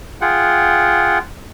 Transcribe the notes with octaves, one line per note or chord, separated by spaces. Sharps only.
F4 G#4 F#5 G5